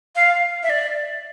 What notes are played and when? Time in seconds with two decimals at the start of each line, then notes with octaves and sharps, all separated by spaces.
0.16 F5
0.63 E5
0.70 D5